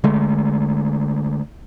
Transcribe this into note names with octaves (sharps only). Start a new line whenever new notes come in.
D3 G#3 A3